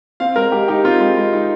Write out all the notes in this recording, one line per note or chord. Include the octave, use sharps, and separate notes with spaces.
C4 F5
G#3 A#4
G#3 G4
D#4 G4
C4 F4
G#3
G#3
D#4